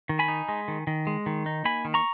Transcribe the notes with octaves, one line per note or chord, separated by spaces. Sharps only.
D#3
G#5 B5
D#4
G#3
D#3
D#3
G#3
D#3
D#4
A#3 G#5 B5
D#3
A#5 C#6